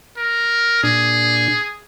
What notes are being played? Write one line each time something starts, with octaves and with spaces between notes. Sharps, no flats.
A#4
A#2 D4 G#4